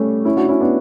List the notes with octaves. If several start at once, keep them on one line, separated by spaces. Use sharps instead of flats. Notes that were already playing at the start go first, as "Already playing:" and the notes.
Already playing: G3 A3 C#4
C#4 E4
D4 F#4
C#4 E4
B3 D4